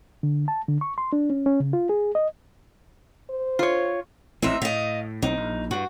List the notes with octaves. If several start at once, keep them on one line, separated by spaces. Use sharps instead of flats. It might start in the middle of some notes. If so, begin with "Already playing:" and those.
D3
A5
D3
C#6
C6
D4
C#4
C#4
C#3
F4
G#4
D#5
C5
F4 C#5
A1 E3 C4 D#4 E5
A2 D#5 F5
B1 C4 D#4
A#1
G2 F#4